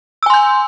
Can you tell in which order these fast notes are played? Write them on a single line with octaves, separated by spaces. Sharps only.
E6 G#5 C6 G6